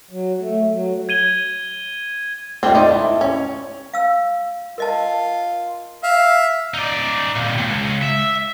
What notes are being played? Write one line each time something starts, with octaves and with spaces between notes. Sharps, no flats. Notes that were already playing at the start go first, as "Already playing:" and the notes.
F#3
A3
F#3
G#6 D#7 G7
A3 C4 D4 F4 G5
D#4 D5 C6 D6
E4 A5
C#4 C#5
F5 E6
F4 A#4 D#5 A5
E5 F5
D#4 D5
A#2 C4
C#2
E5